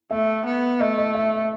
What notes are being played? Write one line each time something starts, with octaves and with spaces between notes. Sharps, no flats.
A3 E5
B3
A3 D#5
D#5
E5